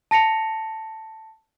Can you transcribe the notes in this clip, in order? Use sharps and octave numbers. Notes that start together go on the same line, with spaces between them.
A5 A#6 C#7 F7